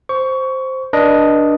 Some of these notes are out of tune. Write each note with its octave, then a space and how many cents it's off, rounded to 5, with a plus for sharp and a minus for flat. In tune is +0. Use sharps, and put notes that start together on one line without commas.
C5 +0 C#6 +20
D4 +0 B4 -45 D#5 +0